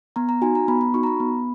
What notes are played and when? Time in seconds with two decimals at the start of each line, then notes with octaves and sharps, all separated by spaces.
0.16 B3 A#5
0.29 A#5
0.42 D#4 F#4 G#5
0.55 A#5
0.68 B3 B5
0.81 B5
0.94 D#4 F#4 C#6
1.03 A#5
1.07 B5
1.20 B3